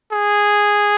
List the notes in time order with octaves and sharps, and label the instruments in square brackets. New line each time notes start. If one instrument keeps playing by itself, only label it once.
[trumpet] G#4